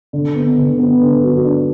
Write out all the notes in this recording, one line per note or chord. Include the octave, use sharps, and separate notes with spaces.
D3
B3
D3
B3
D3
F#3
D4